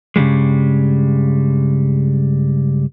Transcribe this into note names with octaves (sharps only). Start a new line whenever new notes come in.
G2 C#3 F3 G3 G#3